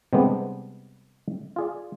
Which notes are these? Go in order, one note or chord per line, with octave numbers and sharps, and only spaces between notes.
C3 G3 G#3 B3 D4
F4 G#4 D5